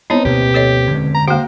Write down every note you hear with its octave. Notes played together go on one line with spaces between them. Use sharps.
B3 C4 D#4 E4 C#5 A5
D2 B2 A#3 G4
A4 C#5 D#5
D3 G#3 C#4
A#5
A#3 F#4 C5 F5 G5